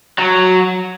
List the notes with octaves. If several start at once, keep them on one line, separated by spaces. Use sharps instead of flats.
F#3